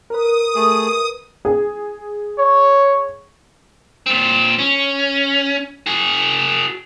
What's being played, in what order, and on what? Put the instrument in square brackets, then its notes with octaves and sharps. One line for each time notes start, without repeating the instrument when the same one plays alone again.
[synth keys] A#4 B4 [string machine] D#6
[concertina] A3 G#4
[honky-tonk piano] G#4
[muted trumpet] C#5
[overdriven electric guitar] A#2 C4
C#4
F#4 G#4